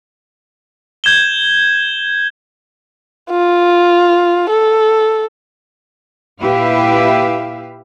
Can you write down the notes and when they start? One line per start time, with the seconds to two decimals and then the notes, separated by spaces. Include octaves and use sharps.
1.04 G6 G#6 E7 G7
3.31 F4
4.50 A4
6.40 A#2 E4 G4 B4 E5 F5